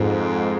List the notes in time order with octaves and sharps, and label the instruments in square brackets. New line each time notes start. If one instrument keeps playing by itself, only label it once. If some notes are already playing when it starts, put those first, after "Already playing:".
Already playing: [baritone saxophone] F2 [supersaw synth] G#2